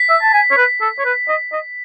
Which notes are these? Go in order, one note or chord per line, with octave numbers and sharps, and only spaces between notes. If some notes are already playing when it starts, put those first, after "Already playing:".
Already playing: B6
E5
A5
G#5
C#5
B4
A4
C#5
B4
D#5
D#5